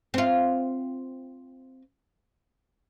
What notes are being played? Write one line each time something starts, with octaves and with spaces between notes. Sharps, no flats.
C4 F4